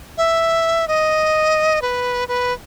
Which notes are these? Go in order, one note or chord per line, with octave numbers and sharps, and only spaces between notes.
E5
D#5
B4
B4